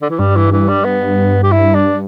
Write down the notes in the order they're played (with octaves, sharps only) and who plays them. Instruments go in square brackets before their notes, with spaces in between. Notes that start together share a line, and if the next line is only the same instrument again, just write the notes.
[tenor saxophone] D3
E3
[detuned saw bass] G2 [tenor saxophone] G3
[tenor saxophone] E3
E3
G3
B3
G4
E4
D4